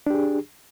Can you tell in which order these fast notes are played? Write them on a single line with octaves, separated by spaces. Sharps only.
D4 G4 G#4